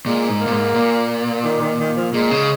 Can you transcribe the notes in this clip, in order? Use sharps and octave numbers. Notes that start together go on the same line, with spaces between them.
A#2 G#3
G#2
A#3
A#2
G#2
A#2
D#3
D#3
D#3
F3
A#2 G#3
C#3